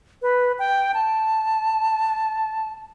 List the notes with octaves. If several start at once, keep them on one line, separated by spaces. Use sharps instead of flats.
B4
G5
A5